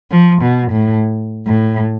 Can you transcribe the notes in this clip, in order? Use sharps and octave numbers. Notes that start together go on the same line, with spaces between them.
F3
B2
A2
A2